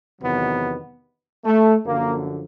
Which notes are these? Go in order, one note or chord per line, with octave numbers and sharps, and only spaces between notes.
E2 C3 D#3 F#3 B3
A3
F#2 D3 F3 A#3